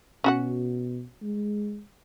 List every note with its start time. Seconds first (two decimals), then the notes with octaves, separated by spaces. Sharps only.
0.24 B2 C#4 F#4 F#5
1.23 G#3